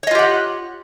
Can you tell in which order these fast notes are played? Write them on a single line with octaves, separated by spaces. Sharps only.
C#5 D#5 F4 G4 F#5